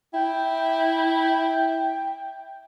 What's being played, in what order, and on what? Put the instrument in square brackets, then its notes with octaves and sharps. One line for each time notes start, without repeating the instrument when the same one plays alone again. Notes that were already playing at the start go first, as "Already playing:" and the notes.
[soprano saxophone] E4 [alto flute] G5